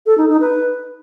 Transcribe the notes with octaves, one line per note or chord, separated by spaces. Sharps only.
A4
D#4
D#4
B4